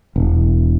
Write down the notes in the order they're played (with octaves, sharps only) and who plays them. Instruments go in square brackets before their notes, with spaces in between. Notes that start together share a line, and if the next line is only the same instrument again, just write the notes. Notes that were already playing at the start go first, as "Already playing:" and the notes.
[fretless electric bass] E1